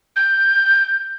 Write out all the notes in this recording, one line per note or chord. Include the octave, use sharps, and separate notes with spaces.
G6